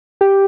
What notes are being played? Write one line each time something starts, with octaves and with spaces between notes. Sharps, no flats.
G4